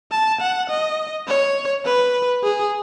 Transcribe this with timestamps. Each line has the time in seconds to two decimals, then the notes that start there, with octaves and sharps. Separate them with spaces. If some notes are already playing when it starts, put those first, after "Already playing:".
0.12 A5
0.41 F#5
0.70 D#5
1.28 C#5
1.86 B4
2.44 G#4